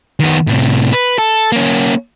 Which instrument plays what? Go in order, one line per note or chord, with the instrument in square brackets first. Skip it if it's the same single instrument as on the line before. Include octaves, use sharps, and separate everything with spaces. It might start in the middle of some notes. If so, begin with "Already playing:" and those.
[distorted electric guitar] D#3 B3
A2 C3
B4
A4
A#3 C#4